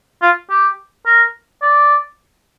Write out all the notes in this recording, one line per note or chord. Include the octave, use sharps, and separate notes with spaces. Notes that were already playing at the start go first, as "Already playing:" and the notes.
F4
G4
A#4
D5